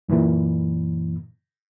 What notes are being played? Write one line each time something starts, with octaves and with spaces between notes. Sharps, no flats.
F#2 A#2 E3